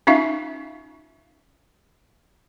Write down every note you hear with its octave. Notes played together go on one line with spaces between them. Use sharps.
C#4 D#4 F4 E5 F5